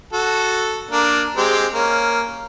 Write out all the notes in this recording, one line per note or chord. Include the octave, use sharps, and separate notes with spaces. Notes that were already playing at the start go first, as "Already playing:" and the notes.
F#4 A4
A#3 D4
G#3 C4 G4
A#3 C#4